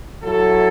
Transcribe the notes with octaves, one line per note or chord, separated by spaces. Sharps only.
F#3 A3 E4 A4